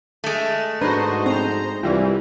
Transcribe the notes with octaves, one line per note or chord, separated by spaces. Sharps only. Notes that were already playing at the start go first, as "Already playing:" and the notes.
G#3 A3 E7
G#2 D4 F#4 B4 C5 D#5 A#5
C4 C5 A#5
C2 E3 G3 F4